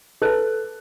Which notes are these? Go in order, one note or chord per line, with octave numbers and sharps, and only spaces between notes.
A4 B4 F#6